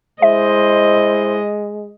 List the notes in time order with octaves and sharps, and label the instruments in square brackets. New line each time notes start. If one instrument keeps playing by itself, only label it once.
[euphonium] G#3 [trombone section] E4 C5 [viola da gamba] D#5 [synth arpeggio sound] E5